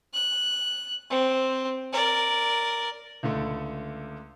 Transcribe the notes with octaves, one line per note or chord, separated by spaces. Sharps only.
F#6
C4
A#4 D5
C#2 D3 A3